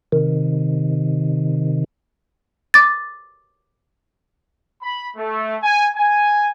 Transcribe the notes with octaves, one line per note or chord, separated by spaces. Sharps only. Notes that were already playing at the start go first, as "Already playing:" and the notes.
C3 D#3
D6 A6
B5
A3
G#5
G#5